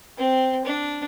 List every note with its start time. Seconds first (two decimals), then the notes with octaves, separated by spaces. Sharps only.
0.18 C4
0.65 D4